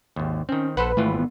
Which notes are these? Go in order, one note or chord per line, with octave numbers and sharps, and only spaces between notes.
G#1 D#2
D#3 C4 C#4
A#1 A4 B4 C5 F#5
G#1 E3 A3 F4
A3 B3